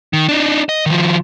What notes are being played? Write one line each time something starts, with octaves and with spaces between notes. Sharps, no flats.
D#3
D4 D#4
D#5
D#3 F3